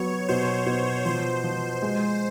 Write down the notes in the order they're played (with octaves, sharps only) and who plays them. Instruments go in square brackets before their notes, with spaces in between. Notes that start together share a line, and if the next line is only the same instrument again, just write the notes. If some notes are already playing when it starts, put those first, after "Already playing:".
Already playing: [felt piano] F#3 B3 [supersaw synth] C#5
[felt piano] B2 [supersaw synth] C5
[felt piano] B2
[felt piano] F3 [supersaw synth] C5
[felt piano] F3
G#3